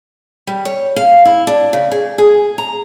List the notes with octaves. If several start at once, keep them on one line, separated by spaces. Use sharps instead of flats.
G3
C#5
F5
E4
D4
C#3
G#4
G#4
A#5